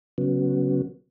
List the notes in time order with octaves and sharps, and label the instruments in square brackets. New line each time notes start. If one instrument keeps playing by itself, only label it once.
[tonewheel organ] C#3 F#3 B3